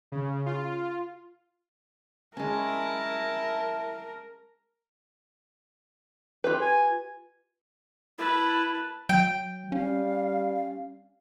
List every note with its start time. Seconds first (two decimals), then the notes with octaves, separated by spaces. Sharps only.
0.12 C#3
0.46 F4
2.37 G#3 C#4 E4 A#4 A5
6.44 F4 G4 B4
6.61 G#5
8.18 E4 B4 A5
9.09 F#3 G5
9.72 G3 C#4 F5